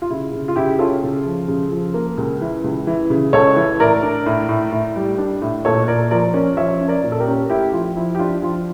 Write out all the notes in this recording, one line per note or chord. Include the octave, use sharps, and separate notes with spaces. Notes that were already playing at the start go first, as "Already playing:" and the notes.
F4
C#3 E4
C#3
F4
C#3 E4 G4
C#4 F4 A4
C#3
F3
C#3
F3
A#3
C#2
E3
C#2
E3
C#3
C#2 A4 C#5
E3
A2 A#4 D5
D4
A2
A2
A2
G3
D4
A2
A#2 A4 C#5
A#2 A#4 D5
F3 A#4 D5
C#4
F3 C#5 E5
C#4
A#4 D5
A#2
A4
G4 A#4
C#4
A3 E4 G4
F3 F4
F3 E4
G4
D4 F4
F3 F4